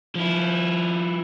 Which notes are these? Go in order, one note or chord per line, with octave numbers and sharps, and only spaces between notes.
F3 E4